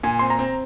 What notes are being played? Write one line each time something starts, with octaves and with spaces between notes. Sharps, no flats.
A#2 G#5
C4 C6
A#5
C4